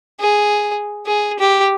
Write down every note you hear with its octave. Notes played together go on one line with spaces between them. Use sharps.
G#4
G#4
G4